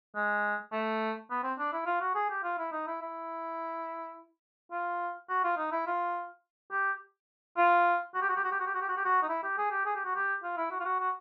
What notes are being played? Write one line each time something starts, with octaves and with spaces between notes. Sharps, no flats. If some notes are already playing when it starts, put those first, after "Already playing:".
G#3
A3
B3
C4
D4
E4
F4
F#4
G#4
G4
F4
E4
D#4
E4
E4
F4
F#4
F4
D#4
E4
F4
G4
F4
F#4
G4
F#4
G4
F#4
G4
F#4
G4
F#4
G4
F#4
G4
F#4
D#4
E4
G4
G#4
G4
G#4
G4
F#4
G4
F4
E4
F#4
F4
F#4
F#4